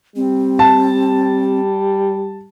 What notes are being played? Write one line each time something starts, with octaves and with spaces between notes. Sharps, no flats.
G3 C4
A5